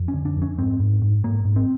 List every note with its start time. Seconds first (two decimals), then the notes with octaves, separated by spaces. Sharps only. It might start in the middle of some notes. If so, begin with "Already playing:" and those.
Already playing: F2
0.08 C#4
0.14 D3
0.25 D4
0.37 F2
0.42 C#4
0.58 G#2 C4
0.80 G#2
1.02 G#2
1.23 G#2 A#3
1.45 G#2
1.56 C4